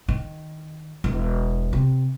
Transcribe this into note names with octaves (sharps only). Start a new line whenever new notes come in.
D#3
E1
C3